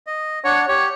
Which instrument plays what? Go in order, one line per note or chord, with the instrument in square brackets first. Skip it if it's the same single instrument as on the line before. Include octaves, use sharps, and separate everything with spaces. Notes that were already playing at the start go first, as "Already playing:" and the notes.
[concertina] D#5
[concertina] D4 F#5 [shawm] C#5
[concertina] G4 [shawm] C#5